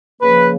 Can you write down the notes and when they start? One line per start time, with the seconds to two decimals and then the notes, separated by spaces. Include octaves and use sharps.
0.21 C#3 F3 A#3 B4